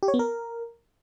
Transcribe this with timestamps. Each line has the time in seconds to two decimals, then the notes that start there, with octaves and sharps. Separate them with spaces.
0.03 G4
0.08 C#5
0.14 B3
0.19 A#4